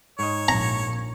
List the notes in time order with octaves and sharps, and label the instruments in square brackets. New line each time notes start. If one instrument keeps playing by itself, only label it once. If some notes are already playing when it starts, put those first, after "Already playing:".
[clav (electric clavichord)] G#2 D#5 [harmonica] C#5
[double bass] A#1 A#2 [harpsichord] A#5